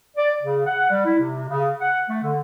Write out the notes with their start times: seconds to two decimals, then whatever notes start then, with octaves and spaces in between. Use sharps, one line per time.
0.17 D5
0.41 C#3
0.66 F#5
0.89 G3
1.05 E4
1.19 C3
1.48 C#3
1.80 F#5
2.09 A3
2.22 D3